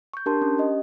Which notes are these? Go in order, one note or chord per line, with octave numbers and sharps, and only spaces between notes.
C#6 G6
D4 G4 A#4 A5 C6
C#4
G4 D#5